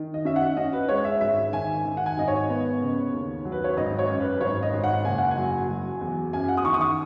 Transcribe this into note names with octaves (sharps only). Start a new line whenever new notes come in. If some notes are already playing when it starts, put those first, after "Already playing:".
Already playing: D#3
D#5
C#4 E5
F#5
C#4 D#5
B4
G#3 C#5
E5
G#1 E5
D#3 G#5
D#3
F#5
G#5
G#1 D#5
C#5
B3
C#3
D#2
F#3
B4
C#5
G#1 D#5
C#5
F#2
B4
G#1 C#5
D#5
G#1
F#5
F#1 G#5
F#5
G#5
F#3
F#3
E2
F#2 G#5
F#5
D#6
D#3 C#6
D#6
C#6